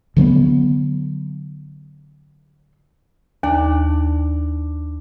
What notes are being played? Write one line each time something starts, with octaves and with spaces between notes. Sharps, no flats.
D3 F#3 A3 B3
D#2 D4